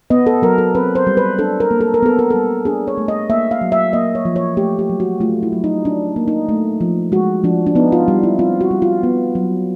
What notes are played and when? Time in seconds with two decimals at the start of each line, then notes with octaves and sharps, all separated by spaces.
0.10 B3 D#5
0.27 A4
0.42 F#3 A#4
0.58 A4
0.75 C4 B4
0.95 C5
1.07 G3
1.17 B4
1.39 D4 A4
1.60 A#4
1.71 A#3
1.81 A4
1.94 A#4
2.03 B3 A4
2.19 A#4
2.30 G3 A4
2.65 D4 G#4
2.88 C#5
2.98 A3
3.08 D#5
3.30 A#3 E5
3.51 F5
3.61 F#3
3.72 E5
3.93 A#3 D#5
4.15 C#5
4.25 F3
4.36 C#5
4.57 A3 G4
4.79 G4
4.90 F#3
5.00 F#4
5.20 A3 F4
5.43 E4
5.53 F#3
5.64 D#4
5.85 D4
6.16 A#3
6.28 D#4
6.49 A3
6.81 F3
7.12 G#3 F#4
7.44 F3 D4
7.67 D4
7.75 B3 D#4
7.92 F4
8.08 G3
8.23 E4
8.39 C4 F4
8.61 F#4
8.71 G3
8.82 F4
9.03 B3
9.35 F#3